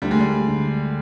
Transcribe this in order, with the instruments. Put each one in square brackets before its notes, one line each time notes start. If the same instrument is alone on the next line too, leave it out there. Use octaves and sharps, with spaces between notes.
[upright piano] D2 [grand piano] G3
[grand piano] G#3
G3
[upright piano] D3